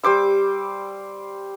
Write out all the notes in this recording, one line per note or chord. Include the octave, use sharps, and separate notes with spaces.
G3 C5 D6 E6